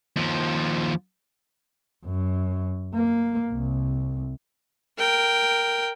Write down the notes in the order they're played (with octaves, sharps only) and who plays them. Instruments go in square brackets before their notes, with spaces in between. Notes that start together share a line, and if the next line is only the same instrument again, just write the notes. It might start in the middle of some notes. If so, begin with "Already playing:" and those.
[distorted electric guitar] D#2 F3
[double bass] F#2
A#3
C2
[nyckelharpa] A#4 G5